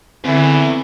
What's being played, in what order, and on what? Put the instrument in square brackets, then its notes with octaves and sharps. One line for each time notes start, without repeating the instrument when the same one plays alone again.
[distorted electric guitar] E2 [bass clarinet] D3 [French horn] E3 [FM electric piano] C4